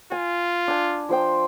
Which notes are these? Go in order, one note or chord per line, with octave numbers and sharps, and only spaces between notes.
F4 G#5
D4 G#5
F3 C5 G5